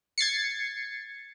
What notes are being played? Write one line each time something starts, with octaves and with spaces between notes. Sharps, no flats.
G#6 A6 C7 C#7